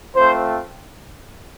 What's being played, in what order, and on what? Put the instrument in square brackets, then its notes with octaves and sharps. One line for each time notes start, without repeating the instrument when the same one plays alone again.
[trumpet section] A3 C4 F4 C5